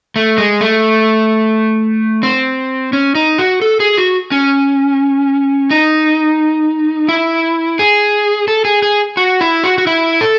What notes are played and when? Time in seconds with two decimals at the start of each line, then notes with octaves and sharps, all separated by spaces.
0.16 A3
0.38 G#3
0.61 A3
2.23 C4
2.93 C#4
3.15 D#4
3.38 F#4
3.62 A4
3.80 G#4
3.97 F#4
4.32 C#4
5.71 D#4
7.09 E4
7.79 G#4
8.48 A4
8.65 G#4
8.82 G#4
9.17 F#4
9.41 E4
9.64 F#4
9.78 F#4
9.87 E4
10.21 A4